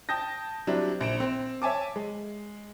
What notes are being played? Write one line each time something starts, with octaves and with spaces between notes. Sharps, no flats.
G5 A5 D#6 G6 A#6
F#3 G3 C4 D4 E4
A#1 D7 E7
C4
C#5 E5 G#5 A5 D6
G#3